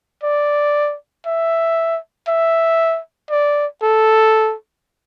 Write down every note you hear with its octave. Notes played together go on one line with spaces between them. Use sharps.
D5
E5
E5
D5
A4